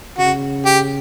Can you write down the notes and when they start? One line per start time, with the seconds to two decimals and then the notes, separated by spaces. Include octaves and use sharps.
0.18 C#3 F#4
0.65 G4